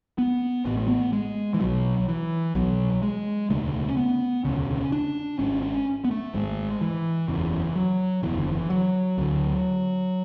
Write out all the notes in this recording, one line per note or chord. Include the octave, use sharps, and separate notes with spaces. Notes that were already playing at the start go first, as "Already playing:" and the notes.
B3
A1 A2 B3
A3
B3
G#3
E3
B1 B2 F#3
E3
B1 B2 F#3
G#3
E1 D2 C#3 A3
C#4
B3
E1 D2 C#3 C#4
D4
G#1 G#2 C#4
C#4
B3
A3
G#1 G#2 G#3
E3
F#1 E2 C#3 E3
F#3
F#1 E2 C#3 E3
D3
E3
F#3
D2 D3